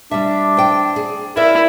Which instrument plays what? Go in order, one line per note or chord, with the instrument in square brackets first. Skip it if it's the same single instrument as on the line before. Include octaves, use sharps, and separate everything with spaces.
[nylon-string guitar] G3 E5 [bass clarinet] D4
[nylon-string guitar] C5 G5
G#4
[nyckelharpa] E4 [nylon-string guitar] A#4 D5 E5